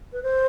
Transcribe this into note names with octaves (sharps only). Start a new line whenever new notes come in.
B4
C5